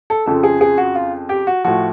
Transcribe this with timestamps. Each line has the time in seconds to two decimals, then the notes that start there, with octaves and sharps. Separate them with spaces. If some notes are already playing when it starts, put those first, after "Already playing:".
0.10 A4
0.26 F2 C#3 F3 A4
0.43 G#4
0.61 G#4
0.78 F#4
0.95 F4
1.29 G4
1.47 F#4
1.64 A2 F3 F#4